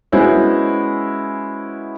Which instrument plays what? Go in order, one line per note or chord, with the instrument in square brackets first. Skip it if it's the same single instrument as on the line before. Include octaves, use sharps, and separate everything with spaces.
[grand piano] G#3 B3 C#4 E4 F#4 C5